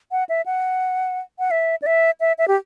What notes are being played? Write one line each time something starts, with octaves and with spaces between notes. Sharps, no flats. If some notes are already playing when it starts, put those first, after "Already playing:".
F#5
E5
F#5
F#5
E5
D5
E5
E5
E5
G4